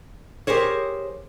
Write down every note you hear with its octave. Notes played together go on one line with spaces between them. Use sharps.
G4 G#4 A#4 C5 C#5